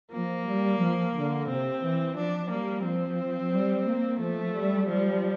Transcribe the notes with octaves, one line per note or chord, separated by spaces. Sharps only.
F3 A#3
G3
F3
D3
C3 C4
E3
F3 D4
G3 A#3
F3 C4
G3
A#3
F3 A3
G3
F3 G3